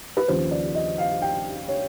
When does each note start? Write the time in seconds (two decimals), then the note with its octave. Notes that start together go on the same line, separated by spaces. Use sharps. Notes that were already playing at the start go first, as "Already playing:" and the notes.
0.17 B4
0.28 D#2 C#3 F3 C5
0.51 D5
0.75 D#5
0.98 F5
1.22 G5
1.68 C#5